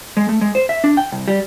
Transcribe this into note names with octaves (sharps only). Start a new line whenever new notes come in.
G#3
A3
G#3
C5
E5
D4
G5
C2
G3